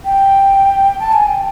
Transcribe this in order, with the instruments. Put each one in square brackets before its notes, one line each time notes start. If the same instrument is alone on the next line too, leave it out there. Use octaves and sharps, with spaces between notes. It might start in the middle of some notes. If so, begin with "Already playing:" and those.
[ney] G5
A5
G#5
G5